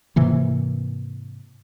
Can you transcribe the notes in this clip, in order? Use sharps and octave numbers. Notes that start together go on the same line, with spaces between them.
G#2 C3 E3 A#3